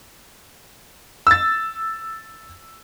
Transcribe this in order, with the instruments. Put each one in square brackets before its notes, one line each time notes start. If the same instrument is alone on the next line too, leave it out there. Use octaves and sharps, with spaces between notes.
[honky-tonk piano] E6 A6